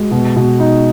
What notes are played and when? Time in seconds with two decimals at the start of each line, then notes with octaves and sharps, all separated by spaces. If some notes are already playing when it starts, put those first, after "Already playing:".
Already playing: G#3 F#4
0.11 B2
0.36 B2
0.60 D#4